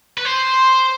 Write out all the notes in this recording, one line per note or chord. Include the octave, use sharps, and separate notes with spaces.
B4
C5